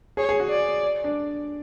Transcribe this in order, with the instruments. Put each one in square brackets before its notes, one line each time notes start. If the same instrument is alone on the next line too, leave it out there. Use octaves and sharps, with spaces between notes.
[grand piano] G#4 [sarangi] C#5
[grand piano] G#4
F#4
[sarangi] D5
[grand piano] D4